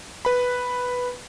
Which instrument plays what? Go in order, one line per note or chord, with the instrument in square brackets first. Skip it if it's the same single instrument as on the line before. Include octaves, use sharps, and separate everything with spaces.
[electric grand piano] B4 B5